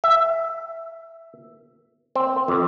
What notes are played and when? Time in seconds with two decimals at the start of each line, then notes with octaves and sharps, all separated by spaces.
0.04 E5
2.16 C4
2.48 F2